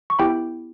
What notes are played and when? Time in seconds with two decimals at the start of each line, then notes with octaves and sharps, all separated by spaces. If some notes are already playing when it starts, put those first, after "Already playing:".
0.10 C#6
0.19 B3 E4 G4 G5 B5